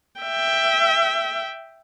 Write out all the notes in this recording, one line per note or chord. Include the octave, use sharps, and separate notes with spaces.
E5 G5